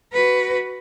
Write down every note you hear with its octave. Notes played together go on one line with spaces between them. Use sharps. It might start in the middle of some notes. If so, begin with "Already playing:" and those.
F#4 B4